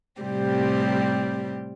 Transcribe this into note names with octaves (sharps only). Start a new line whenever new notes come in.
A2 C3 G3 C4 G4